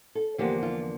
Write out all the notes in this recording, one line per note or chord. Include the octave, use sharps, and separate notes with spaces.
A4
E2 D3 F3 A#3 G4
F4